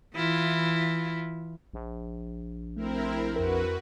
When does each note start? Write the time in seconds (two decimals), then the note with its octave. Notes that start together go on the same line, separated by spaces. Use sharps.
0.15 E3 E4 F4
1.74 A#1
2.77 A3 C4 E4 A#4
3.36 F2 F#4 A#4 B4